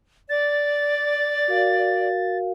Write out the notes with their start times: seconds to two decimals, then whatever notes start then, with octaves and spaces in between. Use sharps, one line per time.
0.29 D5 A6
1.48 F#4 A#4 F5